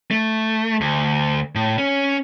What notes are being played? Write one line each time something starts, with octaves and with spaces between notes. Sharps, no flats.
A3
D2
A2
C#4